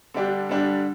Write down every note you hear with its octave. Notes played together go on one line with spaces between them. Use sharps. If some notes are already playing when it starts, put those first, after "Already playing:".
D3 G3 D4 G4
D3 G3 D4 G4